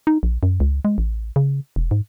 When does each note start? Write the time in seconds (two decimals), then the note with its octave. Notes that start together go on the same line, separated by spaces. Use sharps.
0.07 D#4
0.23 A#1
0.43 F#2
0.60 C#2
0.85 G#3
0.98 A1
1.36 C#3
1.76 E1
1.91 G#2